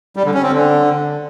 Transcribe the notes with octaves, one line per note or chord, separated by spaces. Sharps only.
G3
D3
C#4
C4
D3